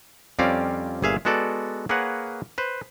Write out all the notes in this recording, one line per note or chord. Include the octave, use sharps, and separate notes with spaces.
F2 G3 C4 C#4 D5 F5
G1 A#2 G#4 E5 F5
G#3 B3 F#4 A4 D5
A#3 G#4 A#4 B4 C#5 F#5
B4 C5